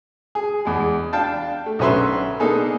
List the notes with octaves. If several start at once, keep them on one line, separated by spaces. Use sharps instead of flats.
G#4
E2 G#3
D4 F5 G5 A5
A3
B1 D3 C#4 B4 E5 C6
A#3 B3 D4 D#4 G#4 A4